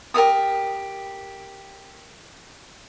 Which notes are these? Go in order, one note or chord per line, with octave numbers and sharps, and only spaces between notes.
G4 A#4 E5 D#6